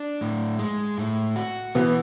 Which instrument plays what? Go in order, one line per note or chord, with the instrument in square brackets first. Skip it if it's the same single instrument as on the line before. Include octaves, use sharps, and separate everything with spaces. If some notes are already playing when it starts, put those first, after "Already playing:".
Already playing: [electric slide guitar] D4
A2
G#3
A2
F#4
[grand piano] B2 B3 [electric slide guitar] E3